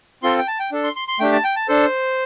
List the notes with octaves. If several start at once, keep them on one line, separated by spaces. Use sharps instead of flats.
C4 F4 A4 C6
G5
A5
G5
D4 A4
C6
C6
C6
A3 D4 G4 G5
A5
G5
A5
D4 A4 C5